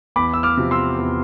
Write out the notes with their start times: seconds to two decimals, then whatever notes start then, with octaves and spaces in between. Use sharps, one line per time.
0.16 E2 B5 D6
0.34 E6
0.43 D6 F6
0.57 C3 F3
0.71 C6 E6
0.98 E2